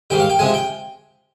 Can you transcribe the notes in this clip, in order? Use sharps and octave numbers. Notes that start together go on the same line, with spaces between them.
G#2 D#3 G3 G5
F5
G5
C3 F3 G#3 G#5
G5